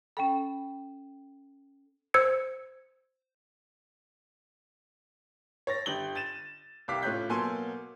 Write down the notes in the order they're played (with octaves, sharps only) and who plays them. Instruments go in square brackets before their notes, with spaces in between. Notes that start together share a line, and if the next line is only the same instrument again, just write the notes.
[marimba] C#4 A4 [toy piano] G5 B5
[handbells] C5 E6 G#6 C#7
[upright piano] C#5 A6 A#6
G1 G4 F#7 G7
A6 D#7 E7
C2 G4 F5 D6 B6
A2 C#4 F4 F#6 G6 B6
B2 F#3 A#3 A4 G#5 C6